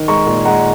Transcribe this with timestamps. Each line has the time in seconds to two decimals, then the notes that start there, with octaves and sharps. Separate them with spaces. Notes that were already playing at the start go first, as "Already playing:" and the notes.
Already playing: D#3
0.08 G#3 A#5 C#6
0.26 A#2
0.45 G#3 F#5 A#5